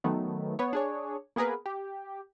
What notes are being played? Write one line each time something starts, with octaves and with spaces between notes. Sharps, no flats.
D#3 F#3 A3 B3
B3 C#5
D4 G#4 C#5
A#3 B3 G#4 A#4 B4
G4